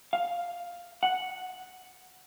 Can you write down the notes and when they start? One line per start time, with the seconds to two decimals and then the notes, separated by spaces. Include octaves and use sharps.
0.13 F5
1.03 F#5